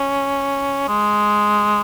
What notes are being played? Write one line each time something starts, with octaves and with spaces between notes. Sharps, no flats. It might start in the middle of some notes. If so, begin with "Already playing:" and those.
Already playing: C#4
G#3